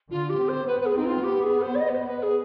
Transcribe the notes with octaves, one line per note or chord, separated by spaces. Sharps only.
D3 F4
G4
C4
C5
B3 B4
B4
G#4
C4 D#4
F4
B3 G4
G#4
C5
D5
D#5
B4
C5
B4
G#4